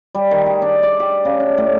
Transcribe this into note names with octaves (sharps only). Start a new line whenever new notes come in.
G3
D#3
G#4
D4
D5
G4
C#3
D4
A2